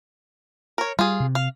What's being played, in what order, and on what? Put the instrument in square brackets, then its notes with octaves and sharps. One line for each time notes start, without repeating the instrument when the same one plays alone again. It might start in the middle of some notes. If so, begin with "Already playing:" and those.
[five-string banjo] A#4 C#5
[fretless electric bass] G3 [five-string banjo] F4 G#4
[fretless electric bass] C3
[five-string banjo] F5